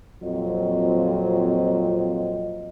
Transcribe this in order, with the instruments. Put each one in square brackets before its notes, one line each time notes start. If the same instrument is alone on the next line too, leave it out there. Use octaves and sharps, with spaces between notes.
[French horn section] F2 A#2 F#3 C4 F4 D#5